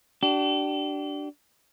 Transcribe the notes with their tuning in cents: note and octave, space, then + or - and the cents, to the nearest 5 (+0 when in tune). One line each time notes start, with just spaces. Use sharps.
D4 +0 G4 -40